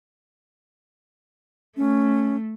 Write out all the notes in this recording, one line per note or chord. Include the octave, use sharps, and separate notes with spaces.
A3 C#4